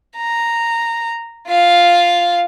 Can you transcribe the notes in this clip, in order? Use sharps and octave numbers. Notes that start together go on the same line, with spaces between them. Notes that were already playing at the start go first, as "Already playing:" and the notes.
A#5
F4 F5